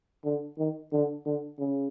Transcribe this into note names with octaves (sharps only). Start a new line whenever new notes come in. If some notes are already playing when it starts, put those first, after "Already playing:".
D3
D#3
D3
D3
C#3